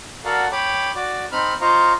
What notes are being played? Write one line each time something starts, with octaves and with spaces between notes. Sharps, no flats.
F#4 A4 A#4 D5 F5 F#5
C#5 G5 B5 D6
F#4 D5 D6
C4 D#4 B5 F6
F4 C5 D#5 F5 A#5 C#6